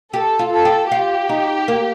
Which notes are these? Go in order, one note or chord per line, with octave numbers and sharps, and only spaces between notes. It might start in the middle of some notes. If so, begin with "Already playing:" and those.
G4 A4
F4
A4
G4
F4 G4
D#4
A#3